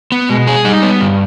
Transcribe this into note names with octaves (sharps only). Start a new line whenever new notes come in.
B3
B2 G#3
G#4
G3 D#4
B3
G2